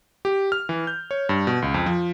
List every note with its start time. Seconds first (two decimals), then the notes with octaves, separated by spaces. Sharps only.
0.25 G4
0.52 F6
0.69 E3
0.87 G6
1.11 C#5
1.29 G2
1.47 B2
1.62 C#2
1.74 F2
1.86 F3